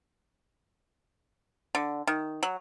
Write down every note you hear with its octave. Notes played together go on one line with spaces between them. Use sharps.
D3
D#3
F#3